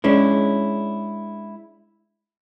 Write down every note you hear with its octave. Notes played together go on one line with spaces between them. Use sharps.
G#3 C#4 D4 E4